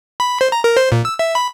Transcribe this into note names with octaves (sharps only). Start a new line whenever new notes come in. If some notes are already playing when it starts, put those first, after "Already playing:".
B5
C5
A#5
A#4
C5
A#2
E6
E5
B5